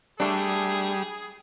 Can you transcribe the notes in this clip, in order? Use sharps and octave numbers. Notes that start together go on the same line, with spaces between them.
G3 A3 D4 G#4